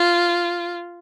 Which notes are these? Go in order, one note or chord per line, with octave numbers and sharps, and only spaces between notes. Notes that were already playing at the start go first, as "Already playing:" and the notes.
Already playing: F4